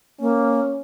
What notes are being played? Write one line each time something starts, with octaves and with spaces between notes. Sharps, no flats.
A#3 C#4